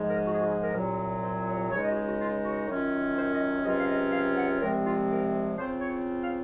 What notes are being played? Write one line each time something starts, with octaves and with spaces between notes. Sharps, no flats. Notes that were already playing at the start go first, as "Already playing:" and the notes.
Already playing: G#2 F3 G#3
A#4
F#4
G#4
F#4
G#4
A#4
C2 A#2 F#3
C5
C#5
C#2 C#3 G#3 D#4 C#5
D#5
F#4
G#4
F#4
F4
F#4
F#2 D#3 F#3 C#4 F4
C5
D#5
C#2 C3 F#3 C#4 F4 D#5
F5
D#5
F5
F#5
C2 C3 F3 G#3 C4 A#4
F4
A#4
C#3 F3 C4 F4 C5
C#5
F5